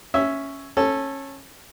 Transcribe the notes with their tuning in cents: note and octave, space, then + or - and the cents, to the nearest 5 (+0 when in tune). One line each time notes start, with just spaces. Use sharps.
C#4 +0 E5 +0
C#4 -20 A4 +0